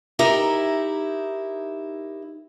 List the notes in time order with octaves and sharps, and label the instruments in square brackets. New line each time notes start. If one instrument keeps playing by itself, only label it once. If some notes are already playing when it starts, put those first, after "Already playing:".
[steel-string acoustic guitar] D#4 E4 G4 A#4 E5